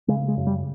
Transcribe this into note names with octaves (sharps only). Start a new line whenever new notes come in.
C#3 G#3
G#3
F#2
G3